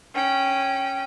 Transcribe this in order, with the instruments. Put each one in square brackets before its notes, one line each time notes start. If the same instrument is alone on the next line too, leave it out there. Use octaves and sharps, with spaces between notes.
[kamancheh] C#4 G5